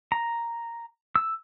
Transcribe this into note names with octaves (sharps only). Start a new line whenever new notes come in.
A#5
E6